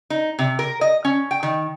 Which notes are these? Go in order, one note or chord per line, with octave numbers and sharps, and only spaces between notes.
D#4
C3
A#4
D#5
C#4
G5
D#3